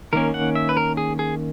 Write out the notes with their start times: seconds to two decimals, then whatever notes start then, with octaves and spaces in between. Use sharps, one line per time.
0.13 D#3 A#3 C#4 A#4
0.34 F#5
0.55 E5
0.69 B4
0.77 A#4
0.97 G#4
1.19 G#4